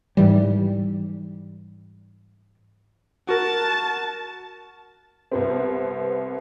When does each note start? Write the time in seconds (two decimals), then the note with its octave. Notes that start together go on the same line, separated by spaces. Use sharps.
0.17 G#2 E3 G3
3.29 F#4 A#4 A5
5.31 C2 B3 C4